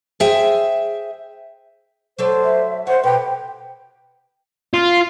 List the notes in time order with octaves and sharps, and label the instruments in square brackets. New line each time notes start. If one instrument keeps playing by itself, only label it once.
[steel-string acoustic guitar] G#4 C5 E5 G5
[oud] F#3 A4 D5 [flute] C5
[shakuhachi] E5
[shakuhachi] C5 [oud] C#5 [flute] F#5
[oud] B2 [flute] B4 [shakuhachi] G5
[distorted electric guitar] F4